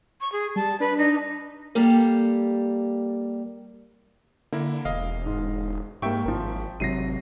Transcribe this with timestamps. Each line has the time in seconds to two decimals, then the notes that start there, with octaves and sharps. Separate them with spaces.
0.21 C#6
0.32 G#4
0.56 G3 A5
0.80 D4 B4
0.98 D#4
1.75 G3 A#3 G4 A4
4.53 D3 A#3 E4
4.85 E1 D#5 F5
5.26 G#2
6.02 G#2 G3 A#3 E5 G5 C#6
6.25 G#1 F3 A#4
6.80 G#1 C3 F#3 A#6 C7 D#7